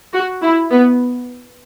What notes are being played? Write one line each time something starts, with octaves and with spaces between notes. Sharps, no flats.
F#4
E4
B3